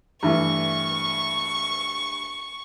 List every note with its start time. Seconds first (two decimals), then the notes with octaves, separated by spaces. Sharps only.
0.23 G2 E3 A3 C#6